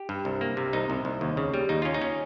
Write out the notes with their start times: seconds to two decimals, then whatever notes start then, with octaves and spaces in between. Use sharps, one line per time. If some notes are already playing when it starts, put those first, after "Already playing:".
Already playing: G4
0.09 G2
0.25 C2
0.41 A#3
0.57 C3
0.73 C2 D#4
0.90 C2
1.05 C2
1.21 D#2
1.37 C#3
1.54 G3
1.69 D#2 D#4
1.82 C#4 F4
1.94 D#4
2.02 C#4